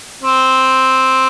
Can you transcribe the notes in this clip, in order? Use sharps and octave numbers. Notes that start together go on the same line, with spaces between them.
C4